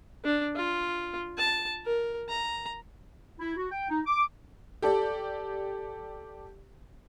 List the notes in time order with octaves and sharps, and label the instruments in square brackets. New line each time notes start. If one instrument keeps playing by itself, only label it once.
[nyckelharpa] D4
F4
A5
A#4
A#5
[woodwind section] E4
F#4
G5
D#4
D6
[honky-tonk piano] G4 A4 D5